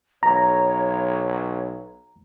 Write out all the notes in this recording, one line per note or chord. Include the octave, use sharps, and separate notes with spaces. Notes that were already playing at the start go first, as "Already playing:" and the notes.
B1 C#5 A#5